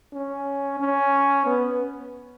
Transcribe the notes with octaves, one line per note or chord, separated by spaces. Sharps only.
C#4
C#4
B3